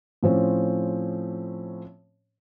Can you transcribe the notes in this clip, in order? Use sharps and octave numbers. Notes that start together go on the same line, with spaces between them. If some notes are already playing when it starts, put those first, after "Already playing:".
A2 F3 C4 C#4